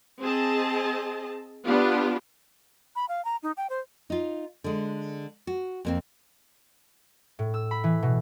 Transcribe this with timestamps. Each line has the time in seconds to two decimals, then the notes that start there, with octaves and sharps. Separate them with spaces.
0.21 C4 G#4 D#5 A5
1.65 B3 D4 F4 G4
2.96 B5
3.09 F5
3.25 A#5
3.43 D#4
3.57 G5
3.70 C5
4.10 D#4 F4
4.64 D3 G#3
5.47 F#4
5.85 F2 A#3 C4
7.39 A2
7.54 E6
7.71 B5
7.84 E3
8.03 B2